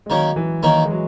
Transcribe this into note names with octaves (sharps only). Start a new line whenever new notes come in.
G#3
D#3 F#3 A#3 C#4
E3
D#3 E3 A#3 C#4
G#3
F#3